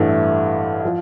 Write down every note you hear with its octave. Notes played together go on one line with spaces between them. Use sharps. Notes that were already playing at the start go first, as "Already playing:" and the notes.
Already playing: A1 G2 E3 A3
F3